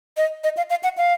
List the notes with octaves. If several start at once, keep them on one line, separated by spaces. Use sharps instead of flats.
D#5
D#5
F5
F5
F#5
F5